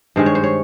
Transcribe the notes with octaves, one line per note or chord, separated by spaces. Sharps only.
G2 D#3 G#3 C5
C#5
C5
C#5